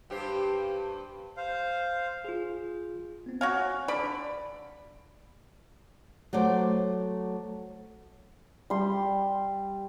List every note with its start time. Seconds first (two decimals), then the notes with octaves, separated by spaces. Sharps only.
0.10 G2 G4 C5
1.37 C5 F5
2.25 F4 G#4
3.26 B3 C4
3.41 F#4 C#5 F5 F#5 G#5
3.88 D3 D5 B5
6.33 F#3 A3 C5 D5
8.70 G3 C6